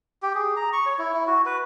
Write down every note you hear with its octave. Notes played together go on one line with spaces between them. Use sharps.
G4
G#4
A#5
C#6
C#5
E4
E4
F#4
B4